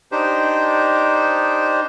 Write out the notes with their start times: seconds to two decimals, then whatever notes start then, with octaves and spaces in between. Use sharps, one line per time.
0.12 D4 D#4 G4 C5